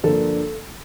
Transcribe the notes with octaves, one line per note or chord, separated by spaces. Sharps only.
G2 D3 F3 A#3 D4 A4